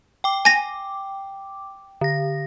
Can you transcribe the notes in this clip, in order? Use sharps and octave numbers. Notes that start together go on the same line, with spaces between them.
G5 D6
G#5 A#6
D3 A#6